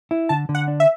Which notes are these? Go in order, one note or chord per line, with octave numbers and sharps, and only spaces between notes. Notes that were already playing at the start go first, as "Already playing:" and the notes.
E4
D3 A5
D3
F#5
D4
E5